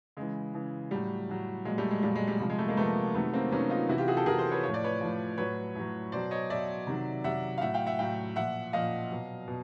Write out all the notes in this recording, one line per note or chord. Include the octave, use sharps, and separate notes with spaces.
C#3 E3 G#3
C#3 E3
A2 F#3 G3
A2 F#3
A#2 F#3 G#3
G3 A3
G#3
A#2 F#3 G3
G#3
G3
C3 F3 G3
G#3
G3 A3
G#3 A#3
C3 F3 A3 B3
C3 D#3 F#3 A3 B3
A#3 C4
C3 D#3 F#3 B3 C#4
D#4 F4
C3 E3 E4 F#4
F4 G4
F#4 G#4
G4 A4
C3 E3 G#4 A#4
A#4 C5
B4 C#5
A2 F3 C#5
D5
B4 C#5
A2 F3
A2 F#3 B4 C#5
A2 F#3
B2 F#3 C5 D5
C#5 D#5
B2 F#3 D5 E5
C3 D#3 F#3
C3 D#3 F#3 E5 F#5
F5
A2 F#3 E5 F#5
F5 G5
E5 F#5
A2 F#3 F5 G5
A#2 F3 E5 F#5
A#2 F3 D#5 F5
B2 F#3
B2